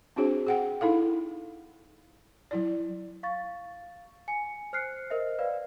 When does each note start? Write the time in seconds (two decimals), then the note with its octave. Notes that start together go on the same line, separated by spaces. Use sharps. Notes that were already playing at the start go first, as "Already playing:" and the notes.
0.16 C4 D4 F#4 G#4 C5
0.47 G#4 F#5 G5
0.81 D#4 E4 A4 F5
2.51 F#3 E4 D5
3.23 F5 C#6 A6
4.28 G#5 C#7
4.73 C5 F6 F#6 C7 C#7
5.10 A#4 C5 D#5 E5
5.39 B4 D5 F5